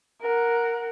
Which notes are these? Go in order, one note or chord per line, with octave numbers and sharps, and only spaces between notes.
A#4 F#5